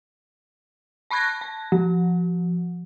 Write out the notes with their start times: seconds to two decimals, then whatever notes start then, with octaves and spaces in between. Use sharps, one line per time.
1.10 A5 B5 C#6 F#6 G#6 A#6
1.41 A5
1.72 F3